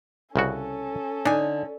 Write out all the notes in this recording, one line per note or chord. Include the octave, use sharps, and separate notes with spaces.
C2 C#3 C#4 F#4 A4
D3 D4 D#4 G#5